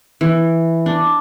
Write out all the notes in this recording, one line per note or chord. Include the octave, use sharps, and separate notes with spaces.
E3
D4